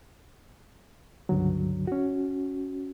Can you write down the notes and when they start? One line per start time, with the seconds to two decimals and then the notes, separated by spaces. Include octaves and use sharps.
1.29 C#2 G2 D3 F#3
1.87 C#4 F#4